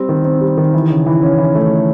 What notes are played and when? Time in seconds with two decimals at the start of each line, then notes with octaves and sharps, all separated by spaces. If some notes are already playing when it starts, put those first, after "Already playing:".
Already playing: G3 C4
0.09 D#3
0.25 C4
0.41 G3
0.58 D#3
0.74 E3
0.90 C#3
1.06 E3
1.23 C#4
1.38 E3
1.55 A3